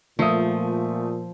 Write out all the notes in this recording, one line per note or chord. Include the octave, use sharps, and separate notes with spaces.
A#2 F3 A3 D#6